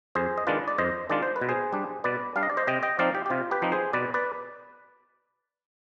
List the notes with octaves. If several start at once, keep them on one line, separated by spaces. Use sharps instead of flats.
F2 G#4 C5
D#5
D#3 G#3 D4 F4 B4 D5
D5
F2 C5 D#5
D#3 G#3 D4 F4 D5
C5
B4
B2
G#4 C5
G3 D4
B2 B4 D5
G3 D4 F5
D#5
D5
C5 D#5
C3 D#5 G5
D#5 G5
F3 C4 D#4 D5 F5
G4
G4
C3 F4
G4 B4
F3 C4 D#4
G#4 C5
B2 B4 D5
B4 D5